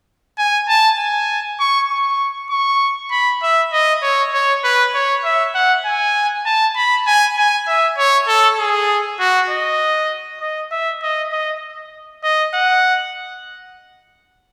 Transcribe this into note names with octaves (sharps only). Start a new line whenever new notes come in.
G#5
A5
G#5
C#6
C#6
C#6
B5
E5
D#5
C#5
C#5
B4
C#5
E5
F#5
G#5
A5
B5
G#5
G#5
E5
C#5
A4
G#4
F#4
D#5
D#5
E5
D#5
D#5
D#5
F#5